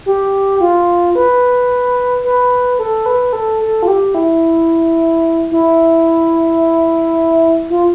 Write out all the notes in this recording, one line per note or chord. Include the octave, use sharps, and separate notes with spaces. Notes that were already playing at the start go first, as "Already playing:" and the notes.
G4
F4
B4
B4
A4
B4
A4
A4
F4
G4
E4
E4
F4